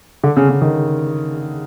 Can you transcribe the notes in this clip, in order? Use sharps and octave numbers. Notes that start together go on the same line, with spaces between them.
D3
C#3
C#3
D#3